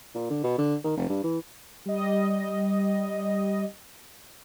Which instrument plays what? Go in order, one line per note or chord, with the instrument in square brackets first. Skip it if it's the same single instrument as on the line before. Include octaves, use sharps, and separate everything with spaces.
[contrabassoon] A#2
D3
B2
D3
D#3
F1
G2
E3
[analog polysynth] G3 D#5